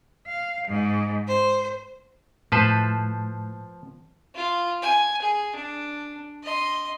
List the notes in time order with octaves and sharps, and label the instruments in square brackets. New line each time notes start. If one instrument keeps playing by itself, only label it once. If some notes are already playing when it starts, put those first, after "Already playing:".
[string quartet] F5
G#2
C5
[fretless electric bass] A2 [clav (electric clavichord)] F3 B4 C5 [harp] A5
[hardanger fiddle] F4
G#5
G#4
D4
D#5 C6